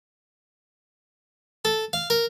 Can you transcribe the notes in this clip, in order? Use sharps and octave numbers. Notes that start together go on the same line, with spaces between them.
A4
F5
A#4